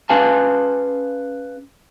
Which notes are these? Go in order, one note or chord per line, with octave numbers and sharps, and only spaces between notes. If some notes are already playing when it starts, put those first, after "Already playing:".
C#4 G#4 B4 F5 G#5 A5